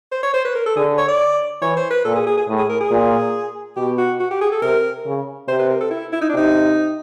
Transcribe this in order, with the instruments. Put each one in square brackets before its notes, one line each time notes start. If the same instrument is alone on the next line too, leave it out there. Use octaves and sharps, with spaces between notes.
[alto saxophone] C5
C#5
C5
B4
A#4
A4
[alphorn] D3 [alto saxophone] G#4
[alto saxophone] C#5
D5
[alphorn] E3 [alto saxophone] C#5
[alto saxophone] C5
B4
[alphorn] A#2 [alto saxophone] A4
[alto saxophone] G#4
G#4
G#4
[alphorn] A2
[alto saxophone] G#4
A#4
G#4
[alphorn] A#2
[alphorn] B2 [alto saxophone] G4
[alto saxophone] F#4
F#4
G4
G#4
A4
[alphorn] C3 [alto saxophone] A#4
[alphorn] C#3
[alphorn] C3 [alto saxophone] C5
[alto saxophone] B4
A#4
A4
E4
E4
D#4
D4
[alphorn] C3 [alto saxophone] D#4